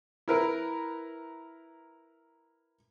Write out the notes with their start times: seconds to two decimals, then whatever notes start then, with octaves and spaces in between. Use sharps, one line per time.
0.28 E4 A#4 B4